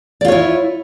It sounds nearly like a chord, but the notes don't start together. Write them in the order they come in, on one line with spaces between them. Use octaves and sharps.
D5 F4 C#5 E4